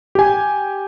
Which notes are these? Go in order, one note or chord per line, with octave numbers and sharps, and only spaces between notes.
G4 G#5